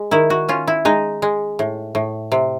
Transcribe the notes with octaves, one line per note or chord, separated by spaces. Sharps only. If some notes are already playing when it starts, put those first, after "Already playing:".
Already playing: G#3
D#3 E4
F#4
C#4 F4
E4
G#3 D#4
G#3
A2
A2
C3